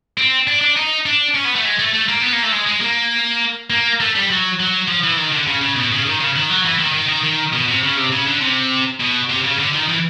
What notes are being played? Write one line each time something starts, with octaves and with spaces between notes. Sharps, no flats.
C4
D4
D4
D#4
D4
C#4
B3
A3
G#3
A3
A3
A#3
B3
A#3
A3
G#3
G#3
A#3
A#3
A3
G3
F#3
F#3
F3
E3
D#3
D3
C#3
C#3
B2
C#3
D#3
C#3
D#3
F#3
E3
D#3
D#3
D#3
D#3
B2
C3
C#3
C3
C#3
D3
C3
B2
C3
C#3
D3
D#3
E3